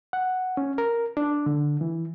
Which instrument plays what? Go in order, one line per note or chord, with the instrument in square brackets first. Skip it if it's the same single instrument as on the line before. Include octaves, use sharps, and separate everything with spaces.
[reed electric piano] F#5
C#4
A#4
D4
D3
E3